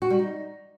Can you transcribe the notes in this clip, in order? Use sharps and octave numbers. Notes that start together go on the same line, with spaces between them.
F#4
G3
D#4